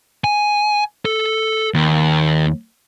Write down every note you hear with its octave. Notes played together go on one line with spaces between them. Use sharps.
G#5
A4
D#2